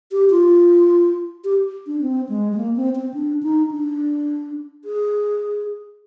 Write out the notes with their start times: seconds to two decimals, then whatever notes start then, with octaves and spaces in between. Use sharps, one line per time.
0.12 G4
0.31 F4
1.44 G4
1.87 D4
2.01 C4
2.29 G#3
2.52 G#3
2.57 A#3
2.76 C4
2.95 C4
3.14 D4
3.43 D#4
3.71 D4
4.85 G#4